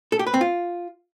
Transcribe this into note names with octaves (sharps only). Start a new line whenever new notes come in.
A4
G4
B4
C4
F4